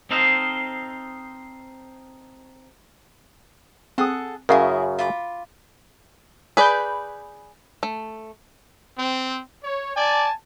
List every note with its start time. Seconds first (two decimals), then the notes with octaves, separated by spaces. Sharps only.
0.11 C4 D#4 A4 C5 D#5 F5
3.98 C4 G#4 A4 F#5 D#6
4.49 F#2 C#3 E4 G#4 A#4 D#5 F5
4.99 F4 B5 D6
6.57 G#4 B4 D5 B5 G6
7.83 A3
8.98 C4
9.64 C#5
9.97 D5 G#5 A5